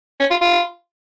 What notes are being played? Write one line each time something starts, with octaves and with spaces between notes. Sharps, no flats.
C#4
F4
F4